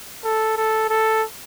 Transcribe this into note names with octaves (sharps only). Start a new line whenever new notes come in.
A4
A4
A4